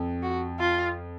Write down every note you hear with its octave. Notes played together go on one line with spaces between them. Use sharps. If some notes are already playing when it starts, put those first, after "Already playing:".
Already playing: F2
F#4
F4